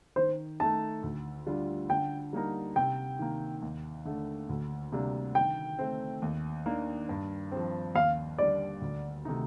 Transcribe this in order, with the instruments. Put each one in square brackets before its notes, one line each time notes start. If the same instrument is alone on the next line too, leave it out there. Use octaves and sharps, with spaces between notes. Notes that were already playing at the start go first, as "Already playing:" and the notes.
[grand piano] D#3 [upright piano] C5
[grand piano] A3 D#4 [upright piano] A5
[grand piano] D2
D3 G3 D4 F4
[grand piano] D3 [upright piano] G5
[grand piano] G3 A#3 D#4 A#4
[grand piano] C3 [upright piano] G5
[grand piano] D#3 A#3
D#2
D3 A3
D2
C3 G3 A#3 D4
[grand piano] D#3 [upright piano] G5
[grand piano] A3 C4
D#2
D#3 A#3 D4
G2
F3 C4
[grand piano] D#2 [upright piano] F5
[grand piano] D3 G3 [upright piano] D5
[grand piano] D2
C3 D#3 A3 D#4